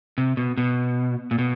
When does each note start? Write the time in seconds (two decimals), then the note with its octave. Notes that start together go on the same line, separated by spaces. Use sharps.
0.18 C3
0.37 B2
0.57 B2
1.31 A#2
1.39 B2